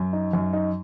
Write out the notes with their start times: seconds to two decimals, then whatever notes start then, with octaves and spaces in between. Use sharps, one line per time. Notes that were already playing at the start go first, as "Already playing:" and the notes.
Already playing: F#2
0.13 D#4
0.33 F#2
0.53 D#4